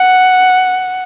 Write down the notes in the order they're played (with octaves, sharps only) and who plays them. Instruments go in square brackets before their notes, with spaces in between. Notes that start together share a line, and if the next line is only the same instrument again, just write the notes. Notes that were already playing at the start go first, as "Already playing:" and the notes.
Already playing: [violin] F#5